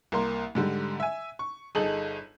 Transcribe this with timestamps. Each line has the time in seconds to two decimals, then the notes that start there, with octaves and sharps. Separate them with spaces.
0.12 C2 A#3 A#4 C6
0.55 G#2 D3 G3
1.00 E5 G#5
1.39 C#6
1.75 G1 D#4 G#4 A4 F#7